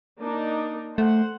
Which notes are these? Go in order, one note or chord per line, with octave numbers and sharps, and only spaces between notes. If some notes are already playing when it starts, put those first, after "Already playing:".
A#3 D4 D#4
A3 C5 F#5